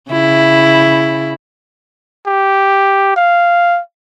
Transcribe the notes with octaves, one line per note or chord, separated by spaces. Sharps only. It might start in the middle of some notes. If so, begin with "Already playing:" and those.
C#3 E4
G4
F5